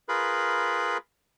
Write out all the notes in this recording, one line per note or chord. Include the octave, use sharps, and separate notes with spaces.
F4 G#4 A#4 B4 B5